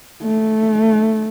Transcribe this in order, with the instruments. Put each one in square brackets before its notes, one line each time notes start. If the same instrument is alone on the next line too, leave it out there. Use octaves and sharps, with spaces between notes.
[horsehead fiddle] A3